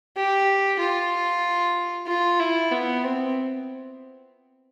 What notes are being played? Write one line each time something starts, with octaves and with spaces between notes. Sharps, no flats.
G4
F4
F4
E4
B3
C4